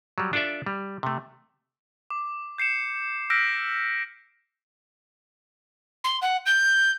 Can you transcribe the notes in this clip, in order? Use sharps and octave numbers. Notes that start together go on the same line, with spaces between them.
F#3 G3
D4 F4 A4 D5 E5
G3
C3 A3
D6
G6 C7 C#7 E7
E6 F6 G6 A#6 B6 D7
C6
F#5
G6